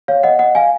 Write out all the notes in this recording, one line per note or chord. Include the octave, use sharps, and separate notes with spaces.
C#5 F5
D#5 F#5
D#5 F#5
F5 G#5